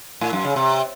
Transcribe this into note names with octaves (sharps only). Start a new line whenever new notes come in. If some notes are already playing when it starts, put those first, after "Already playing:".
A2
F#2
C#3
C3